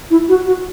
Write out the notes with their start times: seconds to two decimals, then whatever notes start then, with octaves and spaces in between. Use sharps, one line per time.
0.10 E4
0.29 F#4
0.46 F#4